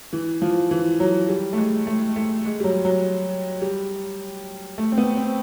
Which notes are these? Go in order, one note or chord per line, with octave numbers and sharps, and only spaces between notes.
E3
F3
E3
F#3
G3
A3
G#3
A3
A3
G#3
G3
F#3
F#3
G3
A3
C4
B3
C4